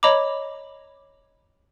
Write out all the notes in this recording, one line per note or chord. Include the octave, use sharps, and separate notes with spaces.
C#5 D#5 A#5 B5 D6